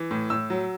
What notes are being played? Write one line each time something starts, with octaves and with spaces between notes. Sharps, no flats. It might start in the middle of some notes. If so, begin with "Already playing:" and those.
Already playing: E3
A2
A2 E6
F#3